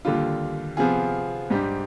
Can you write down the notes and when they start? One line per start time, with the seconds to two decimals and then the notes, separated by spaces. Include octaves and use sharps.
0.05 D#2 D3 G3 D4 F4
0.77 C3 F3 B3 F4 G#4
1.50 G#2 G3 D4 G4